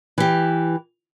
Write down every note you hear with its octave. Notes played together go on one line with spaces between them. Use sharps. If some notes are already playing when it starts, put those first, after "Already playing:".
E3 G4